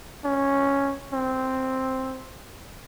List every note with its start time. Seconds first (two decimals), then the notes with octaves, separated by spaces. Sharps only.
0.24 C#4
1.13 C4